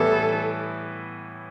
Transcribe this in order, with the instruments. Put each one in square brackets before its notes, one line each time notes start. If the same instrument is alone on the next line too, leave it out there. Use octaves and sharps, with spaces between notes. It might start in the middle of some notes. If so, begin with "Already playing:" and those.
Already playing: [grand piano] A2 E3 G3 B3 E4 [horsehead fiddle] A4